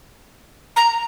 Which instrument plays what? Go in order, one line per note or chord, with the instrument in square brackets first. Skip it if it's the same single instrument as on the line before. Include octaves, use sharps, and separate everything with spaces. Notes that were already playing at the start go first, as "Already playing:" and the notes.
[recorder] A#5